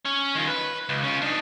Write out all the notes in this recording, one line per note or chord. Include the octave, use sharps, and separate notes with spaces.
C#4
D#3 F4
B4
C#2
C#4 F4
D4 D#4